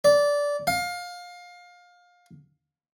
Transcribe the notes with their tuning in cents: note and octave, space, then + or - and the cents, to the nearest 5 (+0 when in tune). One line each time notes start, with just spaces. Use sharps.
D5 -15
F5 +25